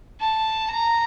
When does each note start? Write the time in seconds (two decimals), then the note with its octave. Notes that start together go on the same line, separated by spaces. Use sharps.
0.20 A5
0.68 A#5